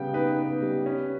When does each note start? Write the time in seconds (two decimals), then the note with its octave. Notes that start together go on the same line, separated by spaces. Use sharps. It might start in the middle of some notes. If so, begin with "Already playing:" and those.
Already playing: C#3 G3 B3 G5
0.13 D#4 B4
0.38 B3
0.62 G3
0.86 C#4